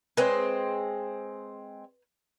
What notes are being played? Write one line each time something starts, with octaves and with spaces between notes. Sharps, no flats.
G#3 C4 B4 C#5